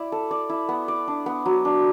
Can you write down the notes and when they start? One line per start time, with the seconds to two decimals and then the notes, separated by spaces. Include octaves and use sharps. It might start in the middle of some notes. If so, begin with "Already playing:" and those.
Already playing: E4 D5
0.12 A4
0.31 D5
0.49 E4
0.69 B3
0.88 D5
1.08 D4
1.26 B3
1.46 F#3
1.65 D4